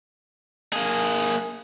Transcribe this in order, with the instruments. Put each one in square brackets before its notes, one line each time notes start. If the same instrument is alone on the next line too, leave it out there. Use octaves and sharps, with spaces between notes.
[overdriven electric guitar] A#3 G#4